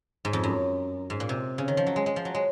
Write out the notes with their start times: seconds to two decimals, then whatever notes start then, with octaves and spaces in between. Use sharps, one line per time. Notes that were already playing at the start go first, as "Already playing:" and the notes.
0.25 G#2
0.33 F2
0.44 F#2
1.10 G#2
1.20 A#2
1.29 C3
1.58 C#3
1.68 D#3
1.77 F3
1.86 F#3
1.96 G#3
2.06 G#3
2.16 F3
2.25 F#3
2.35 G#3